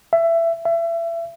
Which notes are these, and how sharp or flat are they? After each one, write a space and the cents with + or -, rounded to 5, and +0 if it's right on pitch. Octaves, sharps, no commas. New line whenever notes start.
E5 +20
E5 +30